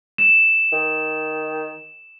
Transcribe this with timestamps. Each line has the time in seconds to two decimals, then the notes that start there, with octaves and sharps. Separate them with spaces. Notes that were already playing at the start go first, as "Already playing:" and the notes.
0.18 E7
0.72 D#3